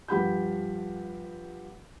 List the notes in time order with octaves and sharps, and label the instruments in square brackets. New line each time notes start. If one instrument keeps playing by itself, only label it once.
[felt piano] G2 F3 G4 F#5 B5 G6